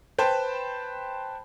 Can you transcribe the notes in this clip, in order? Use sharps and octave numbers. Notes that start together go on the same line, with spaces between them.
B4 C5 G5 A5 B5